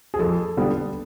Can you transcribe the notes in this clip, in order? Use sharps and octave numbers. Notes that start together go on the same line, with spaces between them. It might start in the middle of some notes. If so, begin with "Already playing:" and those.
G#4
F2 A4
D3 G3 B3